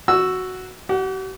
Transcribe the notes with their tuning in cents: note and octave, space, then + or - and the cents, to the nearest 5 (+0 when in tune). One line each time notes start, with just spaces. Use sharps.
F#4 +0 E6 +0
G4 -45 F#5 +0